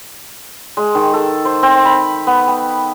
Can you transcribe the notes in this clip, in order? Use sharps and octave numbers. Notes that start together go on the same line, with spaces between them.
G#3
D#3
A4
C5
C4
B5
B3
G5